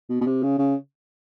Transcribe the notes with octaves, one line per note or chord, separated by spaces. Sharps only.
B2
B2
C3
C#3
C#3